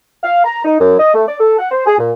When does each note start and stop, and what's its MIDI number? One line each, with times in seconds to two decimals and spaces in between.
0.24 0.42 77
0.44 0.64 82
0.64 0.79 63
0.80 0.95 42
0.99 1.11 75
1.14 1.22 57
1.27 1.39 74
1.40 1.55 69
1.59 1.68 78
1.71 1.83 72
1.86 1.98 68
1.98 2.12 46